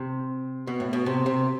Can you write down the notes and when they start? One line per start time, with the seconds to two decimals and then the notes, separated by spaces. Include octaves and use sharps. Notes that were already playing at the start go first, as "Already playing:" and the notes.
Already playing: C3
0.67 B2
0.80 A2
0.93 B2
1.06 C3
1.26 C3